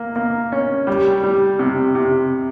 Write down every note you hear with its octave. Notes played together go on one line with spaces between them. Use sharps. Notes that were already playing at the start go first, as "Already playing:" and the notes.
Already playing: A#3
A#3
C#4
G3
G3
C3
C3